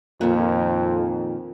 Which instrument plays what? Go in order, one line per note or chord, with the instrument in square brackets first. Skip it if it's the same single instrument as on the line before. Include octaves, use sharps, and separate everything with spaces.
[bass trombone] F2 [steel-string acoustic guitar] A#2 D#3